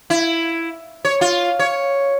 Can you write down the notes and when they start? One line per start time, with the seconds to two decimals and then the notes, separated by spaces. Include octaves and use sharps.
0.10 E4
1.05 C#5
1.21 F4
1.59 C#5